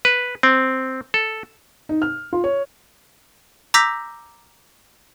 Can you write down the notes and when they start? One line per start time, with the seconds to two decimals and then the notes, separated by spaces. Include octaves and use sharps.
0.05 B4
0.43 C4
1.14 A4
1.89 D#4
2.02 F6
2.33 F4
2.44 C#5
3.74 A#5 D6 E6 G6 A#6 B6